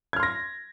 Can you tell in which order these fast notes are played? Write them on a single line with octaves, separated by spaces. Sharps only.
G#6 F6 C6 A#6